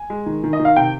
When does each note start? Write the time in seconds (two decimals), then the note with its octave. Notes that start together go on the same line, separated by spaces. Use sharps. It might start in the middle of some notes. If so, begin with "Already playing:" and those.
Already playing: G#5
0.10 G#3
0.26 D#3
0.44 D#3
0.53 D#5
0.59 D#3
0.65 F5
0.76 C3 G5